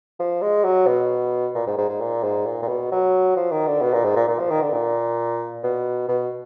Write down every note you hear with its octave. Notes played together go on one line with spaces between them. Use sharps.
F3
G#3
F#3
B2
A#2
G#2
G#2
G#2
A#2
G#2
A#2
A#2
B2
F#3
F3
D#3
D3
B2
A#2
G#2
A#2
A#2
F3
D#3
D3
A#2
B2
B2